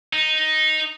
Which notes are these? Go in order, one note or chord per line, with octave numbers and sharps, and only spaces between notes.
D#4